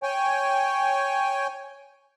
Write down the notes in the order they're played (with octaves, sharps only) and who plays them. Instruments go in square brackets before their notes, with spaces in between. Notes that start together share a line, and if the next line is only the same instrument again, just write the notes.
[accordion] C#5 G5 G#5